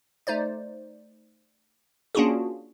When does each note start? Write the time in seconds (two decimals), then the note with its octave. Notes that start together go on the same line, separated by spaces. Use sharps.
0.27 A3 D#4 C5 D5
2.15 A#3 C#4 D4 F4 F#4 G#4